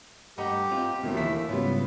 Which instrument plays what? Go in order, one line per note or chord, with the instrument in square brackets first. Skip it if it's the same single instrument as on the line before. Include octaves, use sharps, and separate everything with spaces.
[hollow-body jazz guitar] G2 A3 [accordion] G4 [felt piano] D#5 F#5 A#5
[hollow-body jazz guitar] C4 F4
[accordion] D#2 A3 [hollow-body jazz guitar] B2 D3 F3 [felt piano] A#3
[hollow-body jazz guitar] E3 A#3 E4 [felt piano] B6
[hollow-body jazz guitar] G#2 C#3 [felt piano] G3 B3 C#5 [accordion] F4